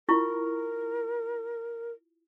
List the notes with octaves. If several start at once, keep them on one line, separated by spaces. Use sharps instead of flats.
E4 F4 A#4 C#6